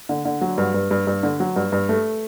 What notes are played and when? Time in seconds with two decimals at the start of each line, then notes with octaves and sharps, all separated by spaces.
0.09 D3
0.25 D3
0.41 F#3
0.58 G2
0.74 G2
0.91 G2
1.07 G2
1.23 D3
1.40 F#3
1.56 G2
1.72 G2
1.89 A3